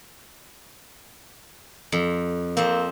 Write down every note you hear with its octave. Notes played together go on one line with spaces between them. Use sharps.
F2
F2 A#3 C4